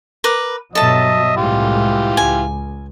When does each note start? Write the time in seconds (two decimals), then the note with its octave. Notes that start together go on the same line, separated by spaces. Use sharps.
0.24 A#4 B4 D6
0.75 G2 B2 F#3 A4 D#5 E5 A5
1.36 C2 A2 E3 G#3 F4 G4
2.17 C#2 G#5